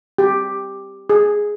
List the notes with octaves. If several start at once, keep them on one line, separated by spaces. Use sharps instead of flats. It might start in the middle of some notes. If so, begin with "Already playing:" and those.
G4
G#4